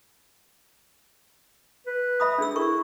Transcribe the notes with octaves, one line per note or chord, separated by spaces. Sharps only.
B4
E5 B5 D#6
D4 G#4 E6
E4 A#4 C#6